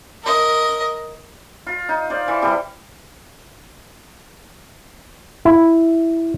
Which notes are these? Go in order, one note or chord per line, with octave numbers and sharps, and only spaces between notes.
A#4 D#5
F4
D#4
C5 D5 F5
E3
C3 E3 G3
E4